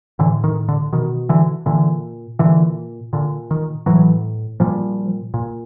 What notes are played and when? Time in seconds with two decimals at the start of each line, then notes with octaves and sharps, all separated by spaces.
0.19 A2 D3 E3
0.44 D#3
0.69 D3
0.93 B2 D#3
1.29 D3 E3
1.66 A#2 D3 E3
2.39 A#2 D3 E3
3.13 A#2 D3
3.51 D#3
3.86 A2 E3 F#3
4.60 A#2 F3 G3
5.34 A#2